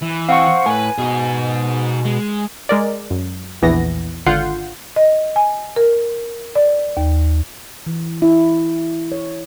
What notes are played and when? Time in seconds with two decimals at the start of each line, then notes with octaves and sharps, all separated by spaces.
0.02 E3
0.29 C4 F5 F#5 C#6
0.66 A2 A#4 B4 G#5
0.98 B2 D#4 G#4
2.05 G#3
2.69 G#3 A#4 D5
3.10 F#2
3.62 A#1 E2 E3 B3 A#6
4.26 G#1 D3 F4 F#5 G6 C7
4.96 D#5
5.36 G#5
5.76 A#4
6.55 D5
6.97 D#2
7.86 E3
8.22 E4
9.12 C#5